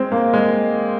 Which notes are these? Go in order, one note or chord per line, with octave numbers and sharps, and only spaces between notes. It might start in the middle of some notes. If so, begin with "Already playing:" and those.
Already playing: G#3 C4
A#3
G#3